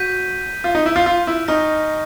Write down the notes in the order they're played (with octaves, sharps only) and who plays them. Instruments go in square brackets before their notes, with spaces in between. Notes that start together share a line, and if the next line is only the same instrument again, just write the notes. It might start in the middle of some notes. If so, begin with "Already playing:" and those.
Already playing: [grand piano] F#4 [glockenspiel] G6 B6 D#7
[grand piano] F4
D#4
E4
F4
F4
E4
[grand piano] D#4 [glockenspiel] G#5 C#6 F6 A#6